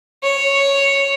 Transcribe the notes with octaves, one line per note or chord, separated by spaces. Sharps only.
C#5